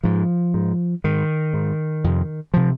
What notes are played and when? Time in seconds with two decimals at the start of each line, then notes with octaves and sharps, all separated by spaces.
0.03 G#2 F3
0.54 G#2
1.04 G#2 D#3
1.53 G#2
2.04 F2 C3
2.54 C3 F3